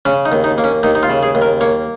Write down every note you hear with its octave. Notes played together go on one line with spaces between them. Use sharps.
C#3 C#4
D#4
D#2
D#4
A#3
C#4
D#2 D#4
D#4
F4
C#3
G#4
D#2
A#4
A#3 C#5